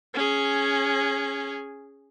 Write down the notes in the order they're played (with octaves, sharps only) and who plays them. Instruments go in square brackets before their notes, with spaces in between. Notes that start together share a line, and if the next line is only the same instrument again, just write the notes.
[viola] C#4 G#4